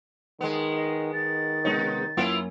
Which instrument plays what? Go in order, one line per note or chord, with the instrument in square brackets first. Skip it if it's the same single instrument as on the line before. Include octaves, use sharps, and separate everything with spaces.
[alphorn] D#3 [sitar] G#3 B3
[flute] D#5
[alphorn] D#3 [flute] A6
[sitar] C3 D#4 [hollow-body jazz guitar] G#3 B3 C#5
[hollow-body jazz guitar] F#2 A#3 C#4 [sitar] B3 E4 F4